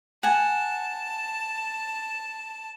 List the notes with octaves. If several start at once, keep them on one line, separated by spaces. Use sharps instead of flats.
F#5 G#5 A5